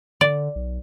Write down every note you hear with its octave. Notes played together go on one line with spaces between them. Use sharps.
D3 D5
B1